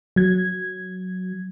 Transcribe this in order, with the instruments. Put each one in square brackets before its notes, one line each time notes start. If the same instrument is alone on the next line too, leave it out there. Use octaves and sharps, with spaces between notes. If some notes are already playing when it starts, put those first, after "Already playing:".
[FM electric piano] F#3 G#6